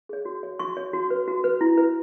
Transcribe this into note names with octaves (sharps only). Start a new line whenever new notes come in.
G#4 C#5
F#4
C#5
F#4 C#6
C#5
F#4
B4
F#4
B4
E4
B4